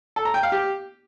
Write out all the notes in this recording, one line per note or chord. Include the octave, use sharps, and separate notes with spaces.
A4
A#5
G5
F5
G4